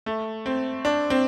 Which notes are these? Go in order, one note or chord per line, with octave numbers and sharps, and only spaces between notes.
A3
C4
D4
C4